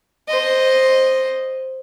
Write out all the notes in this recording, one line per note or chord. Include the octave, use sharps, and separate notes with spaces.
C5 D#5